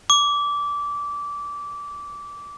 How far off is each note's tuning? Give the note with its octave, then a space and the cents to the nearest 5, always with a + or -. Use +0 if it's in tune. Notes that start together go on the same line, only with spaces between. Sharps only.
D6 -20